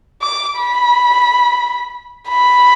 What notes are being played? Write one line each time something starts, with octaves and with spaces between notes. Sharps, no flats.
D6
B5
B5